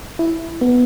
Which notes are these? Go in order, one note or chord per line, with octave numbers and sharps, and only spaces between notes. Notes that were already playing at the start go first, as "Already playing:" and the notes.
E4
B3